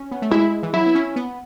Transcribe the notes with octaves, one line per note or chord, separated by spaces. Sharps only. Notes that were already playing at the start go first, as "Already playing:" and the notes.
Already playing: C#4
B3
A3
G#3 E4
E3
F#3 E4
B3
C#4
B3